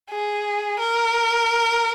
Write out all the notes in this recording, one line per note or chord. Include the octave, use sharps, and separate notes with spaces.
G#4
A#4